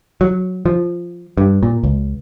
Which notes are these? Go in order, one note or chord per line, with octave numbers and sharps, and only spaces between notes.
F#3
F3
G2
A#2
C#2